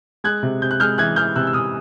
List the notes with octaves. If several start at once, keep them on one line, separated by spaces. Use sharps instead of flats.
G#3 F#6 G#6
C3
C3 G6
F#6
G#3 F6 G6
E3 F#6 G#6
E3 F6 G6
C3 E6 F#6
E6
C3 D#6 F6